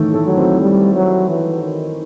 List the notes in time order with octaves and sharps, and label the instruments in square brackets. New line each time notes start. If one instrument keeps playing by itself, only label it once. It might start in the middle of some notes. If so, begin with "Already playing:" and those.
Already playing: [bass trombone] A2 [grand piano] D#3 E3 A3 E4 A4
[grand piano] A3 A4
[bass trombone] F#3
[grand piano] C4 C5
[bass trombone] G3
F#3
E3
D#3